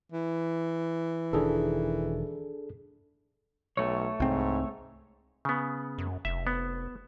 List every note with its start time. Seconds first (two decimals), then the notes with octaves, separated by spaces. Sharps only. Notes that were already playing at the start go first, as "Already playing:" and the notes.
0.12 E3
1.33 E1 D#3 D4 G#4 A4
3.77 B1 A3 C#5
4.20 C2 G#2 C4
5.45 C#3 B3
5.98 F#2
6.25 F1 E5
6.47 B3